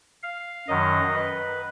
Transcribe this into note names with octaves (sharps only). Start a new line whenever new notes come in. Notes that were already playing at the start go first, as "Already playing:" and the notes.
F5
F#2 D#3 F#3 D#5
B4